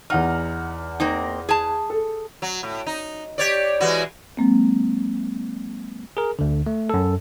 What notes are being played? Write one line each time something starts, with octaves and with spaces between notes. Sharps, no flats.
E2 D#4 F#5 F6
A#3 C4 D#4
G#4 A5
A4
F#3
A2
D#4
G4 C#5 D5
E3 G#3 F#4
F#3 G#3 A#3 C4
G#4 A#4
D2 D3
A3
F#2 A4